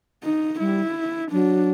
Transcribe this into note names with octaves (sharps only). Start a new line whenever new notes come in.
D#4
G3 E4
F#3 D4